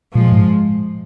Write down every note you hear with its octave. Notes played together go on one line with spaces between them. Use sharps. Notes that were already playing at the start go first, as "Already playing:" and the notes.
A#2 F3 G#3
G#2